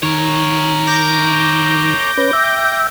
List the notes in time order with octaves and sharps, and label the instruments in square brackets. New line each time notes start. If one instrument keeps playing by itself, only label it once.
[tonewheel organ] D#3 [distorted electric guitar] A#4 C#5
[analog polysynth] D6 G6 A#6
[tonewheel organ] C#4 B4
E5 G5